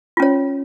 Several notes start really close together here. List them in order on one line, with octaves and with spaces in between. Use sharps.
F4 C#4 C#5